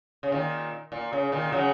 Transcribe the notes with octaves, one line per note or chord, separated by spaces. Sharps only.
C#3
A#2 D#3
A#2
C#3
A#2 D#3
C#3 F#3